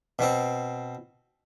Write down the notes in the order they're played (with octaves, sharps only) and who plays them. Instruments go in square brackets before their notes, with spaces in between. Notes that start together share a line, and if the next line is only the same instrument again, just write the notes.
[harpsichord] B2 C4